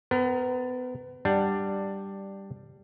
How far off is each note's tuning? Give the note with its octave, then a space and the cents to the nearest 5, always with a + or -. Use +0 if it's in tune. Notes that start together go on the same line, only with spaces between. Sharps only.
B3 +30 A#4 +0
G3 +0 D4 +10 F#5 +0